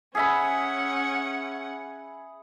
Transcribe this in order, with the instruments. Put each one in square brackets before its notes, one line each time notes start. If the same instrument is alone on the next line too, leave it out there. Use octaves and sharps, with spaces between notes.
[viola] C#4 F#5 [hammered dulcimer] G#4 E5 B5